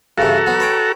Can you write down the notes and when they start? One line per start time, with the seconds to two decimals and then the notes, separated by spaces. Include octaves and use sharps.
0.18 G2 C#3 E3 F#4 A4 A#5
0.46 F#3 B3
0.60 B4 C#5 G5